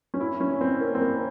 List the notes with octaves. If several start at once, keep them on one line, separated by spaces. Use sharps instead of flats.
C#4
E4
C#4
C4
A#3
C4
A#3